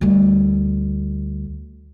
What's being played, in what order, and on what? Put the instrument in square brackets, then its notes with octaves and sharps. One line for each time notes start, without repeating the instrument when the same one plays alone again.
[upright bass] D2 G3